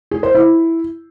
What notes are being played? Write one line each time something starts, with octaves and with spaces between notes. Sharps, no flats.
G#4
C5
E4